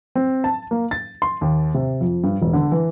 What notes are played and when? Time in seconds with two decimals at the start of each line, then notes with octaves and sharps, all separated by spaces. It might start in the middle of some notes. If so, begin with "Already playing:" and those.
0.15 C4
0.44 A5
0.71 A#3
0.91 A6
1.22 C6
1.41 D#2
1.74 C3
2.01 F2
2.24 G2
2.42 E1
2.53 D3
2.72 E3